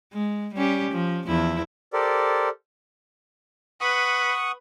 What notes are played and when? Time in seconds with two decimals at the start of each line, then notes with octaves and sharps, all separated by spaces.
0.13 G#3
0.54 G3 C#4 G4
0.91 F3
1.26 E2 F3 E4
1.93 G4 A4 A#4 C5 D5
3.81 B4 F#5 C#6 D#6